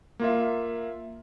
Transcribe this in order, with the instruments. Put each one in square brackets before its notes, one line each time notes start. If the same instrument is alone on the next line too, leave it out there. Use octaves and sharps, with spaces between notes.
[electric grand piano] A#3 F4 E5